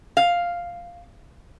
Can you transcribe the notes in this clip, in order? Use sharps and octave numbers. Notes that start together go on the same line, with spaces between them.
F5